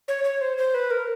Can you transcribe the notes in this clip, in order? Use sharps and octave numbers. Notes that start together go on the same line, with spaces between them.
C#5
C#5
C5
C5
B4
A#4